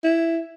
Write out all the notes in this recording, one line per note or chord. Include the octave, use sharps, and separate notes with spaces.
E4